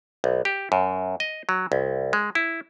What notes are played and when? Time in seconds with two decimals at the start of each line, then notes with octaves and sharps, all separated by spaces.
0.24 B1
0.45 G4
0.72 F#2
1.20 D#5
1.49 F#3
1.72 C2
2.13 G#3
2.35 E4